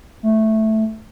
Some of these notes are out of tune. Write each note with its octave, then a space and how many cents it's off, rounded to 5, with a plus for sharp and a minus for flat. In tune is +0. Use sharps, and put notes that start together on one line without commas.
A3 -5